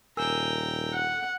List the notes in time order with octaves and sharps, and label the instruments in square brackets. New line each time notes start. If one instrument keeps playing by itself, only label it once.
[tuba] D#1 [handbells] A#4 G#5 E6 [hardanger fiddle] G5 A#5
[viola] F#5